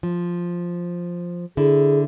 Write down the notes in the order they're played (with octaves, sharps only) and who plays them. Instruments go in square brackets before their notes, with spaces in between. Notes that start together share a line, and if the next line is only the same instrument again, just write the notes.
[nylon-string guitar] F3
[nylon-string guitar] D3 E4 [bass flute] G#4